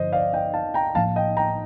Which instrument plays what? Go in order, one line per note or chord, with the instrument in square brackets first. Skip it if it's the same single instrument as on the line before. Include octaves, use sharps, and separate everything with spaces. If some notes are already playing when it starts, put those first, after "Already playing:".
Already playing: [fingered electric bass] G2 D3 F3 [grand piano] C5 D#5
[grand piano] D5 F5
D#5 G5
F5 A5
G5 A#5
[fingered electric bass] A2 F3 A#3 [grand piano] F5 A5
[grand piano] D#5 G5
G5 A#5